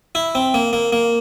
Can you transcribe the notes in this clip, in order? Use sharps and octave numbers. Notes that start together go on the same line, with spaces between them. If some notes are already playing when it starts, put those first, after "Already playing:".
E4
C4
A#3
A#3
A#3